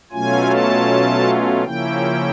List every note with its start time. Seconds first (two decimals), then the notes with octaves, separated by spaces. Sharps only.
0.12 B2 F#3 A3 C#4 F4 G#5
0.51 A5
1.64 C#3 F3 A#3 C#4 E4 G5